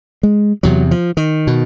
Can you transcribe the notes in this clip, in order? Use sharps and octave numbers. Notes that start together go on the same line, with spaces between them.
G#3
E2 C3 F#3
F3
D#3
B2